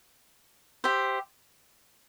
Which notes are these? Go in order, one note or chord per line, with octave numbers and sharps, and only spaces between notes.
G4 C5 E5